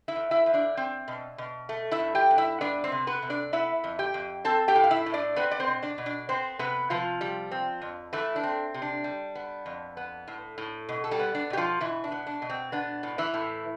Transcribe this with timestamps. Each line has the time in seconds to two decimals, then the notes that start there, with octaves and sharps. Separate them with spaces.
0.08 E4 E5
0.16 E2
0.31 E4 E5
0.46 E2
0.54 D4 D5
0.77 C4
1.08 B2
1.38 B2
1.69 A3
1.91 E4 E5
2.00 G2
2.15 G4 G5
2.30 G2
2.38 E4 E5
2.61 B3 D4 D5
2.84 C4 C5
2.92 C3
3.07 B3 B4
3.22 C3
3.30 D4 D5
3.53 B3 E4 E5
3.84 F2
3.99 G4 G5
4.14 F2
4.45 C4 A4 A5
4.68 G4 G5
4.75 A2
4.84 F5
4.91 E4 E5
5.06 A2
5.14 D4 D5
5.36 B3 C4 B4
5.51 D5
5.60 C4 C5
5.67 B2
5.82 D4 D5
5.98 B2
6.06 D4 D5
6.29 B3 C4 C5
6.59 C3 B3 B4
6.90 C3 F3 F4
7.21 G3
7.51 C4
7.82 F2
8.13 E3 A3 E4
8.36 D4
8.43 C4
8.74 C3
8.82 D4
9.04 G3
9.35 B3
9.66 F2
9.97 B3
10.27 A2
10.58 A2
10.89 B2
11.04 A4
11.11 G3 G4
11.19 B3
11.35 D4 D5
11.50 B2 G4
11.57 F3 F4
11.80 B2 E3 E4
12.04 D4
12.12 B3
12.27 D4
12.42 B2
12.50 C4
12.72 B3 D4
13.03 A2
13.18 E3 E4
13.34 A2